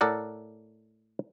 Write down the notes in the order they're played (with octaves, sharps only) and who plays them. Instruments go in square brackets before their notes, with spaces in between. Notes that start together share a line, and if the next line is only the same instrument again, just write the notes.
[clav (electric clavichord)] A2 A4 A#4 D5 F#5